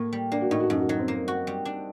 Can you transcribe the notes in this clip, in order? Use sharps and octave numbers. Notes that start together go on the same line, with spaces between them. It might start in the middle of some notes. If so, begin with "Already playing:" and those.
Already playing: A2 A#3
G3
A#3 D4
F#4
A2 D#4
F#4
F#2 D#4
F#4
F#3 D#4
C4
A#3
F#4
G3
D4